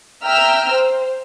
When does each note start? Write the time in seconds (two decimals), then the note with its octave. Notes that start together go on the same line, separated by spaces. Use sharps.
0.24 E5 G5 A#5 E6 F6
0.74 C5